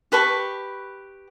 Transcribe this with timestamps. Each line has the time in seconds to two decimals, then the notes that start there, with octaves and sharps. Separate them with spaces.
0.12 G4 B4 A5 C#6